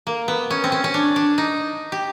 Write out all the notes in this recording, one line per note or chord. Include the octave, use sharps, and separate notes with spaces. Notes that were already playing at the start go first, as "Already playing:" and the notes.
A#3
B3
C#4
C4
C#4
C#4
D4
D4
D#4
G4